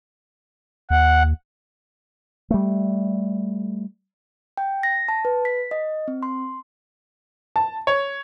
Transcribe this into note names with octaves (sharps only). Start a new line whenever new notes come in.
D#2 F#5
G3 A3
G5
A#6
A5
B4
B6
D#5
C4
C6
A5
C#5